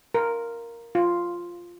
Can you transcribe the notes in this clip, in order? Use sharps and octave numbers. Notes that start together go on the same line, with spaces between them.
A#4
F4